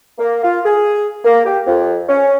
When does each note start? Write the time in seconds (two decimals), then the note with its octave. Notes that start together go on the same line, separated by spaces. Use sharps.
0.18 A#3
0.42 F4
0.65 G#4
1.25 A#3
1.45 G4
1.66 F2
2.09 C#4